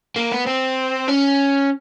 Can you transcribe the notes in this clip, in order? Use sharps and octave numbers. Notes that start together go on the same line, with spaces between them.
A#3
B3
C4
C#4